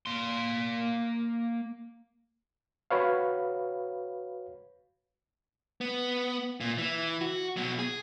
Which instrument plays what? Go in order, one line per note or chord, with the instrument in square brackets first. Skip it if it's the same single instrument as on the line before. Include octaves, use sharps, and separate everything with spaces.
[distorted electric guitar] A#3 C6
[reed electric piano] F#4 B4 C#5 F5
[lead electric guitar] B3
A#2
E3
F#4
B2 F#3
G#4